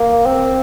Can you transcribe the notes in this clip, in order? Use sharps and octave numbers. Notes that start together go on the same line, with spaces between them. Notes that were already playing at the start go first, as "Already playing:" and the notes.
Already playing: A#3
C4